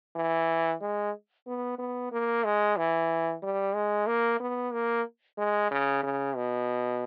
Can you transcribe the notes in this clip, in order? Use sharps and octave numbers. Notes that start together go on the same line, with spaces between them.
E3
G#3
B3
B3
A#3
G#3
E3
G3
G#3
A#3
B3
A#3
G#3
C#3
C#3
B2